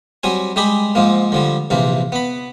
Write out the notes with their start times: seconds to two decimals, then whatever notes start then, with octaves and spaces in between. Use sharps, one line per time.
0.23 F#3 G3 C4 G#5
0.56 G3 G#3 G4 G#4 B5
0.95 G#2 F3 G#3 A#3
1.32 D3 F3 G3
1.70 A#1 C3 E3 A#3
2.12 B3 B5